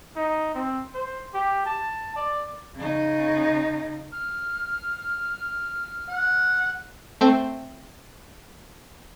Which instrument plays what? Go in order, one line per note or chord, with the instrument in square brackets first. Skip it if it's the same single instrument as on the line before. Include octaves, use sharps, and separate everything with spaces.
[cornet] D#4
C4
C5
G4
A5
D5
[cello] C#3 D#4
[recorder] F6
[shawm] F#5
[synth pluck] A3 C4